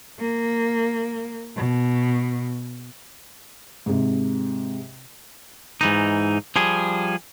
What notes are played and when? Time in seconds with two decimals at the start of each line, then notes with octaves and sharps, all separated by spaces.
0.19 A#3
1.56 B2
3.86 G#2 C3
5.81 G#2 E3 D#4
6.56 F3 G3 G#4